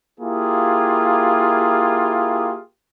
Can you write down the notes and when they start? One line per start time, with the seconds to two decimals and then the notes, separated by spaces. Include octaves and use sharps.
0.20 A#3 E4 F4 G4 G#4